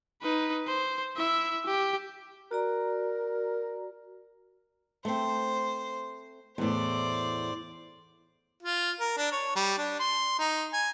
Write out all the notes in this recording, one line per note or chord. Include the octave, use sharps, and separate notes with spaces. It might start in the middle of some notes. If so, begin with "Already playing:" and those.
D#4 B4
C5
E4 E5
G4
F#4 A#4 D5 A#5
A3 C4 C5
E2 A2 C5 D5
F4
A#4
D4
C#5
G3
D4
C6
D#4
G#5